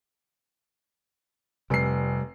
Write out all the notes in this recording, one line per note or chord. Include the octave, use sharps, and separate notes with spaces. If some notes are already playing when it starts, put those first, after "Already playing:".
F1 C3 G3 C7